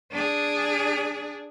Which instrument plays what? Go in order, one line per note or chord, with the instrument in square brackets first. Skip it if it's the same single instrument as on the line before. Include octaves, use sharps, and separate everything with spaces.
[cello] D4 G#4